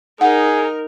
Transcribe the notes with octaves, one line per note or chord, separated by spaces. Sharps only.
D#4 G#4 A#4 F#5